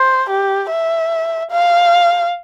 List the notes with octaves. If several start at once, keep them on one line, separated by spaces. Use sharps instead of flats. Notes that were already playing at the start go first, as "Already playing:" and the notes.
Already playing: C5
G4
E5
F5